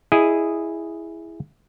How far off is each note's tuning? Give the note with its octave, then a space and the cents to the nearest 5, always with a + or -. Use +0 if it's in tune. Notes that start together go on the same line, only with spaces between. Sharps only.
E4 +0 G#4 -5 D#5 -5